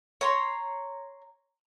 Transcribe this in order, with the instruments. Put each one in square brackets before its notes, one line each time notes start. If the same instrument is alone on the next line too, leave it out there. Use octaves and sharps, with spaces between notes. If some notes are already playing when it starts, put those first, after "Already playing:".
[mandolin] C#5 A#5 C6